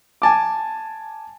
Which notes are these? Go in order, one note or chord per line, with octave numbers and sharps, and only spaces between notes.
G#5 A5 D6